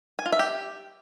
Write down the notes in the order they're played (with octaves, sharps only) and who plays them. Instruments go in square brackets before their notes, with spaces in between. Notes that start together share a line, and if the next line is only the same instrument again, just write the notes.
[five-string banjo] G#5
F4
E5
G4